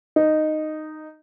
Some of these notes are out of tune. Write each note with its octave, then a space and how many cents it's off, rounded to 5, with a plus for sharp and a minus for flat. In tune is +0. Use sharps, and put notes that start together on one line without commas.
D#4 -10